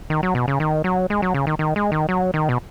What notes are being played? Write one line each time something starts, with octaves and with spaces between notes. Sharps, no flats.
D#3
F#3
B2
C#3
D#3
F#3
G#3
F#3
C#3
D#3
D#3
G#3
D#3
F#3
D#3
B2